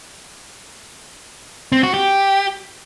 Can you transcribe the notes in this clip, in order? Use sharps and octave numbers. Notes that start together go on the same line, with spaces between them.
C4
F#4
G4